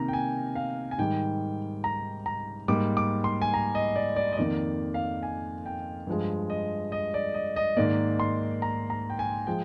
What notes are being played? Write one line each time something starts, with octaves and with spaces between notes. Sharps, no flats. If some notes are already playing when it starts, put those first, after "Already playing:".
Already playing: C3 D#3 A#3 A#5
G5
G#5
F5
G#5
G#2 D#3 G3 G5
A#5
A#5
G#2 G3 A#3 D6
D6
C6
G#5
A#5
D#5
D5
D5
D#5
F2 D#3 A#3 D5
F5
G#5
G5
G2 F3 G#3
D#5
D#5
D5
D#5
D#5
G#2 D#3 A#3 D5
C6
A#5
A#5
G5
G#5
F3 G#3 G5